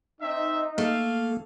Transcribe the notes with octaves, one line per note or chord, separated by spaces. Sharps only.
C4 D#4 E5
A3 A#3 F5